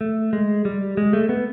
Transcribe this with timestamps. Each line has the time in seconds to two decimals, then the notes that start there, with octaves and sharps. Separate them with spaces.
0.01 A3
0.33 G#3
0.65 G3
0.97 G#3
1.13 A3
1.29 B3